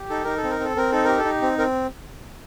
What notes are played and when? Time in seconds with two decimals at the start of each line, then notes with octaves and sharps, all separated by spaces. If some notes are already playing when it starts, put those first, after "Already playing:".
Already playing: G4
0.10 D#4 A4
0.24 D#4 A#4
0.37 A4
0.44 C4
0.51 A#4
0.60 C4 A4
0.76 C4 A#4
0.92 D#4 A4
1.05 G4 A#4
1.18 A4
1.25 D#4
1.42 C4
1.58 C4 A#4